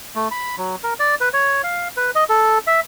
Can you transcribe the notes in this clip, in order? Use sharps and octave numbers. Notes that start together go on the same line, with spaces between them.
A3
B5
F#3
A#4
D5
B4
C#5
F5
B4
D#5
A4
E5